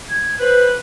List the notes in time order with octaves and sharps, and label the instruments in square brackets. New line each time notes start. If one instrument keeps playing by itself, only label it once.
[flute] G#6
[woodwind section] B4 [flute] C5